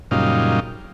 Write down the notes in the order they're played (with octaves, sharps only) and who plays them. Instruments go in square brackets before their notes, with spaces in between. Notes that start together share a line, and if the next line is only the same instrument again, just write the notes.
[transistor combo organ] F#2 A#2 C#3 G3 D#4 F4